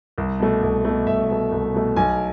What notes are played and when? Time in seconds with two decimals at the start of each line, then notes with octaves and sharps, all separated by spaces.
0.18 C2
0.40 B2 A3
0.62 C2
0.85 B2 A3
1.07 C2 E5
1.29 B2 A3
1.52 C2
1.74 B2 A3
1.96 B1 G#5